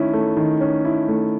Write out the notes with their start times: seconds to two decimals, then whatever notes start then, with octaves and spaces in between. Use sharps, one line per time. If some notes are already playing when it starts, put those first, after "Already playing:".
Already playing: D#3 A3 C#4 E4
0.13 A3
0.37 D#3
0.60 C#4
0.85 E4
1.08 A3